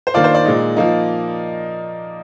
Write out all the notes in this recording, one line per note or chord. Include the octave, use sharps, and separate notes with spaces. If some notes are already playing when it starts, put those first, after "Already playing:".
C5
D#3 A#3 D4 F4 D5
C5
D5
A#2 G#3 D#4
F3 A#3 D#4